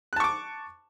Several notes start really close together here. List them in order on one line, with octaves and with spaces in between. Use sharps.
F#6 A5 C#6 D6